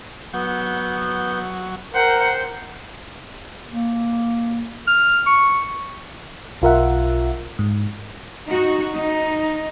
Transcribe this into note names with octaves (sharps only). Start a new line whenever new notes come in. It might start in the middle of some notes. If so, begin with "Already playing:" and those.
F#3 B3 G6
A#4 C5 F#5 G5 C6
A#3
F6
C#6
B1 F4 A#4 E5 F#5
G#2
D#4 F#4
D#4